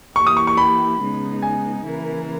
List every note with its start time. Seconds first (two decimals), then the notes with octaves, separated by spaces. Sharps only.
0.15 E3 A#3 E4 G4 C#6
0.27 D#6
0.37 C#6
0.47 C#6
0.57 B5
1.00 C#3 G#3 B3 D#4
1.42 G#5
1.85 C#3 E3 A#3 E4 A#4